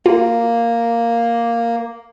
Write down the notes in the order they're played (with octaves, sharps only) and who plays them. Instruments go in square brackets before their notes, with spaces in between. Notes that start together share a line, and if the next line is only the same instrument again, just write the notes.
[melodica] A#3 [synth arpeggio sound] F4